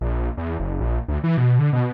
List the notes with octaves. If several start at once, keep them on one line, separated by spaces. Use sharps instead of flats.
A#1
E2
F#1
A#1
D2
E3
B2
D3
B2